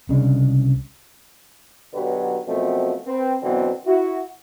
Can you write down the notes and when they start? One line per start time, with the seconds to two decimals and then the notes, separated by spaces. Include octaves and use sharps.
0.09 C2 C#3 G#3 D4
1.94 B1 D3 F#3 G4 B4
2.48 F#2 B2 F3 A3 C4
3.07 C4 B4
3.43 B2 D3 E3 F#3 B3 C4
3.86 E4 F#4